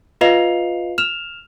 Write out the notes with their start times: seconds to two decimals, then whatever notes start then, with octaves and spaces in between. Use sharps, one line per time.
0.21 F4 B4 D#5 F5 C7 F7
0.98 F6 E7 F7